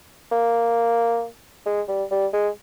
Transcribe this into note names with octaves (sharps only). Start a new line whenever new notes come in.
A#3
G#3
G3
G3
G#3